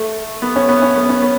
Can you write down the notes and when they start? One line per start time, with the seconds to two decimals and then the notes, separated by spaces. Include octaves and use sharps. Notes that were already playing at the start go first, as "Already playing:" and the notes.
Already playing: A3
0.42 B3
0.56 C#4
0.69 B3
0.82 C#4
0.96 B3
1.09 C#4
1.22 B3